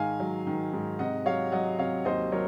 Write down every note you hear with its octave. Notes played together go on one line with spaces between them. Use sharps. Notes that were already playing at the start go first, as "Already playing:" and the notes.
Already playing: G#2 D#3 F5 G#5
F#3
D#3
G#2
C3 D#5 F#5
F#3 C#5 F5
F#3 D#5 F#5
C3 C#5 F5
D#2 C5 D#5
F#3 A#4 C#5